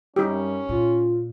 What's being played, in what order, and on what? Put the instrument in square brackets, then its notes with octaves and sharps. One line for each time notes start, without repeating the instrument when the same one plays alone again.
[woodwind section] F#2 G3 [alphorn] C#4 [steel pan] D#4 G4
[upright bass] A#2 [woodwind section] F4